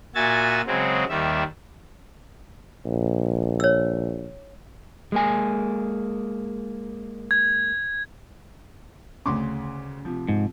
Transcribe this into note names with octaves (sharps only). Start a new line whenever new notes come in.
A#2 F#4 E5 G#5 A6
C#3 F#3 G#3 C4
D#2 D#3 G3 E5
A#1
C#5 E6
G#3 A#3 G#5
G#6
D2 C#3 C6 D6
C3 F3
G#2